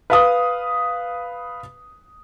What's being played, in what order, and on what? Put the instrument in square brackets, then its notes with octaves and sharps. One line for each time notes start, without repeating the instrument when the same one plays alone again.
[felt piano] B4 F5 D#6